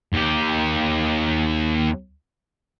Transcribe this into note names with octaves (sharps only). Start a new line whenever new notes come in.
D#2 G4